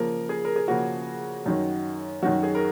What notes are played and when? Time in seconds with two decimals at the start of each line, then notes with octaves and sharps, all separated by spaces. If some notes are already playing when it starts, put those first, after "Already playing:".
Already playing: C#3 F3 A#3 A#4
0.29 G#4
0.45 A#4
0.56 G#4
0.68 C#3 F3 A#3 F#4
1.46 F#2 D#3 F#3
2.23 F#2 D#3 F#3 F#4
2.43 G#4
2.55 A#4